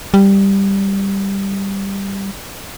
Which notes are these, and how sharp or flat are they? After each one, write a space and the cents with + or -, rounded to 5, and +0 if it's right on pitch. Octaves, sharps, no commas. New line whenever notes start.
G3 +5